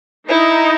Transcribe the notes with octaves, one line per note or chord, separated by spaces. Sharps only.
D#4 E4